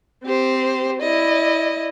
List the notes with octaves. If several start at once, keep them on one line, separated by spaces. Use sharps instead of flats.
C4 G4 C5
E4 D5 D#5